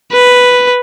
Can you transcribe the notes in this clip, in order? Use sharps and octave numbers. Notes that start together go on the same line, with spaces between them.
B4